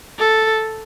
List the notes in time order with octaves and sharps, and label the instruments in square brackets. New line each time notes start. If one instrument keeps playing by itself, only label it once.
[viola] A4